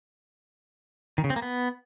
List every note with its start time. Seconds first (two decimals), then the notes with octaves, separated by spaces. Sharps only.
1.18 D#3
1.24 C#3
1.30 C4
1.36 A#3
1.42 B3